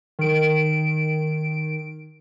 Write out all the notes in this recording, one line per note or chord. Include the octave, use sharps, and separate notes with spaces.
D#3 D7